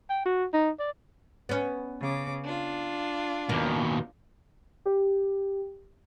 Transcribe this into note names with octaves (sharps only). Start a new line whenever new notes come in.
G5
F#4
D#4
D5
B3 C#4
C#3 D6
D4 F4
D#2 B2 A#3
G4